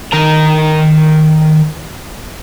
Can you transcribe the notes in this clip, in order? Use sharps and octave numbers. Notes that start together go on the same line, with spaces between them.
D#3 A#4 A#5